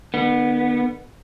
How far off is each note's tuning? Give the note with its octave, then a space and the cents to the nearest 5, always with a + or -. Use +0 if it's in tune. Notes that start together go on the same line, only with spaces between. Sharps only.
D3 +45 B3 -15